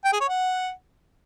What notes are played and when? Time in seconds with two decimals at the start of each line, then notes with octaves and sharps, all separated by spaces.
0.05 G5
0.13 G#4
0.21 C#5
0.28 F#5